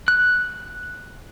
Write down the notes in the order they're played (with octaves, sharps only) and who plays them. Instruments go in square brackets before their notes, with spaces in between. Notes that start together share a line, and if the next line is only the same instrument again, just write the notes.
[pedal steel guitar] F#6